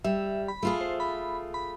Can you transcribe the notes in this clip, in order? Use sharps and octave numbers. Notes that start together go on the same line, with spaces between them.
G3 E5
B5
A3 F4 G#4
C5
B5
B5